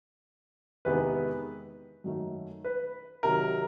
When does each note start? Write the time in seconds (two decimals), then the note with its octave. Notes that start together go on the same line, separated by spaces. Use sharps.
0.85 E2 C3 D#3 G#3 B3 B4
2.04 F#2 D#3 F#3 A3
2.64 B4
3.23 C3 D#3 F#3 A#4